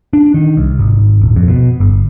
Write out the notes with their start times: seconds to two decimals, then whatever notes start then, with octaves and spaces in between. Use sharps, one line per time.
0.13 D4
0.34 D#3
0.57 C2
0.79 G#1
1.21 D#1
1.36 F2
1.48 B2
1.80 G1